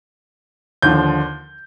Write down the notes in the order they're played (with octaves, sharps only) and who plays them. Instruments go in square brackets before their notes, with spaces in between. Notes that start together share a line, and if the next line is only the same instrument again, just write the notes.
[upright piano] D#2 D3 F3 G6